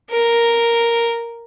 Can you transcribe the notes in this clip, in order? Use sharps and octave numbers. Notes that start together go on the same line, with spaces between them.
A#4